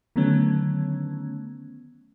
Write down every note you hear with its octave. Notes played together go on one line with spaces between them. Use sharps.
D3 D#3 F#3 A3 B3 C#4